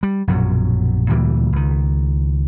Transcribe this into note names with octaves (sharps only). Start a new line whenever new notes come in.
G3
A#1 F#2 B2 F#3
D2 A#2 E3 G3
C#2 D#3